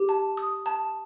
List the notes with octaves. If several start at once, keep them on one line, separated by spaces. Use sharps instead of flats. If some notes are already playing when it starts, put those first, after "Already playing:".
Already playing: G4
A5
D#6
A5